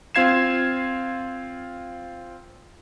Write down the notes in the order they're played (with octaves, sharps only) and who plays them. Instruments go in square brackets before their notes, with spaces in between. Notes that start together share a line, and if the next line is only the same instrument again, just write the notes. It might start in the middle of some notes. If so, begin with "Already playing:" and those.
[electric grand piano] C4 F4 F5 G#6 C7 E7